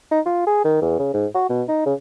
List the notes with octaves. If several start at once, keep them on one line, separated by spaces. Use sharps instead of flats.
D#4
F4
G#4
D#3
E2
C#3
G#2
F#4
B2
D#4
C#3